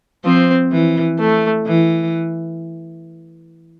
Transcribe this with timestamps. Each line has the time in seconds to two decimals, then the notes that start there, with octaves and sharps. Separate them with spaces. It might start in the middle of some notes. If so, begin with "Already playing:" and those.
0.24 F3 C4
0.72 E3
1.20 A3
1.67 E3